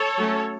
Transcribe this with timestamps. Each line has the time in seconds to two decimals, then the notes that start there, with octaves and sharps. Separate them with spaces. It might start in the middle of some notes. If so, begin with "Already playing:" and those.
Already playing: A4 C#5
0.18 F#3 A3 C#4